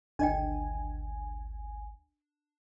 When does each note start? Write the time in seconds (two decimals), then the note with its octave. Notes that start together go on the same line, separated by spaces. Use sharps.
0.19 G#1 D2 D4 D#5 G5 G#5